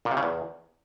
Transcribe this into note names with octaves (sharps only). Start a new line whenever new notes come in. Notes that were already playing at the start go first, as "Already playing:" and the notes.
A#2
C3
C#3
E2